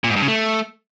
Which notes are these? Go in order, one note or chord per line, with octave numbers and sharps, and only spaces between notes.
A#2
G#2
G2
C#3
A3